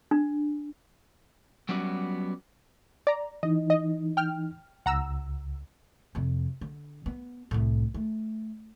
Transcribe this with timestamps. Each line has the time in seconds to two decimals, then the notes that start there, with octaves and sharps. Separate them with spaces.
0.11 D4
1.69 F#3 G3 B3 C#4 F#4 D5
3.07 D5 A#5
3.43 E3 D#4 D#5
3.70 D#5
4.17 G5 F6
4.86 C#2 F#5 A#5 E6
6.15 F2 C3
6.61 D3
7.06 B3
7.51 C2 A2
7.94 A3